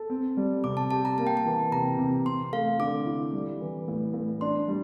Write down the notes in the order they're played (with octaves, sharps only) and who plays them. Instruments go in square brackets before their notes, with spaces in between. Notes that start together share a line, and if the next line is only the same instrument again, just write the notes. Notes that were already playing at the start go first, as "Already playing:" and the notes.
Already playing: [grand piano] A4
C4
G3
[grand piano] C3 [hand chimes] D6
[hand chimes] A5
[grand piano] G4 [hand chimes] A5
[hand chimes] A#5
[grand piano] A#3 [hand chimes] A5
[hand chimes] G5
A5
[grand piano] E3
[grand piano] C3 [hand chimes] A#5
[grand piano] C3
[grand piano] C4 [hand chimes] C6
[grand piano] A3 [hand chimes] F5
[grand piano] D3 [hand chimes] D6
[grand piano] E4
G3
E3
A2
A2
[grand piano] D4 [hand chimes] C6
[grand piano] G3